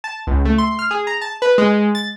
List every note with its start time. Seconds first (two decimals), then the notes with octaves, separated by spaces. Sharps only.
0.04 A5
0.27 C#2
0.45 A3
0.58 C6
0.79 F6
0.91 G#4
1.07 A#5
1.21 A5
1.42 B4
1.58 G#3
1.95 A6